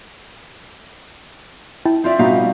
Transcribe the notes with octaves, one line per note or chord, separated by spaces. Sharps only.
E4 G5 A5
C4 F4 D5 E5
B2 G3 D#4 F5